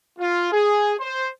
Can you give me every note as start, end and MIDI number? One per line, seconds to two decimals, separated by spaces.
0.19 0.51 65
0.53 0.93 68
1.00 1.28 72